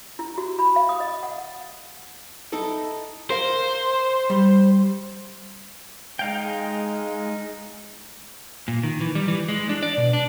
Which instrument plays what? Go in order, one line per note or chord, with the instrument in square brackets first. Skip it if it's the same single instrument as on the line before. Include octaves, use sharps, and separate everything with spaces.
[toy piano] E4
F#4
B5
F5
D#6
D#5
F#5
[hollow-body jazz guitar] D#4 E4 A4
[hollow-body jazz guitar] A#4 F5 [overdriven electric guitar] C5
[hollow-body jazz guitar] G3
[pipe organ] G#3 [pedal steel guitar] D#4 F5 G5
[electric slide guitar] A#2
D#3
E3
G3
E3
G#3
D4
D5
B2
D4